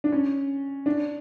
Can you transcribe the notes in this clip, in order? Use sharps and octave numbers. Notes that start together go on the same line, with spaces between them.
D4
C#4
D4